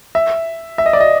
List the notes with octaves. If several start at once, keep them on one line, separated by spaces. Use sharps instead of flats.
E5
E5
D#5
D5
D#5